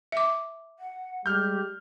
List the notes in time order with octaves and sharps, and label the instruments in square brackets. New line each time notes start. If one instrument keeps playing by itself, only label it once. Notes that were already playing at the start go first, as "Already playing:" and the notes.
[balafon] E5 D6
[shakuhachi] F#5
[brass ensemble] G3 G#3 [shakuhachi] G4 [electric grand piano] F6 G6